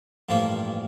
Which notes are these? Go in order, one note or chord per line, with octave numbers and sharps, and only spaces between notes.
A1 G2 F3 A#3